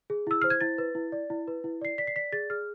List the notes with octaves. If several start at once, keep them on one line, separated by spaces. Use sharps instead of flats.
G#4
E4 E6
C5 F6
G#6
E4 A6
B4
E4
D5
E4
B4
E4
D5 C7
D5 B6
C7
D5 B6
G#4 A6
G#4 F6